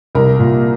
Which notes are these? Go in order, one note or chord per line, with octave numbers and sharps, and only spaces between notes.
C2 A#4
A#2